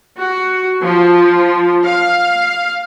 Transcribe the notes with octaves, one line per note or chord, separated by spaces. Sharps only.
F#4
F3
F5